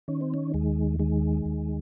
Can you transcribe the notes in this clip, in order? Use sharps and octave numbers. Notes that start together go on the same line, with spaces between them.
D#3 C#4
C4
C#4
D#2 G#3
D#3 G#3
D#2